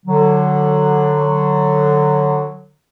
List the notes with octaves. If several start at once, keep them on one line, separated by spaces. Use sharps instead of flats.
D3 F#3